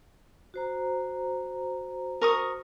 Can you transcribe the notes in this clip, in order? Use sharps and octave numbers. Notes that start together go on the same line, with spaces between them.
F#4 C5 A#5
A#4 C#6 D#6